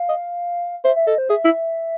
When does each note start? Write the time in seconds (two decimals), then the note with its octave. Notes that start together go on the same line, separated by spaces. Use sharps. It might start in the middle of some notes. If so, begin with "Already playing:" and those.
Already playing: F5
0.09 D#5
0.84 C5 E5
0.96 E5
1.07 A4 D#5
1.18 C5
1.30 G#4 E5
1.45 E4